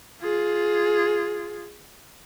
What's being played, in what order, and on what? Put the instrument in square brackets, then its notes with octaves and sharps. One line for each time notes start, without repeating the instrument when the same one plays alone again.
[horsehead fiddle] F4 G#4